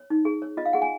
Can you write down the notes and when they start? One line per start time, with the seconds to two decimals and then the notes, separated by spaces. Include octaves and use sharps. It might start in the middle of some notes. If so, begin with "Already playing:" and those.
Already playing: C#5
0.10 D#4
0.25 G#4
0.42 C#5
0.57 F4 D#5
0.65 F5
0.73 G#4 F#5
0.82 G#5